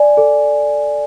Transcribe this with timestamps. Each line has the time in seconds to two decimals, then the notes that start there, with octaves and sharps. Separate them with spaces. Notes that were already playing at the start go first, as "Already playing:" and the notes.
Already playing: D5 G#5
0.17 A4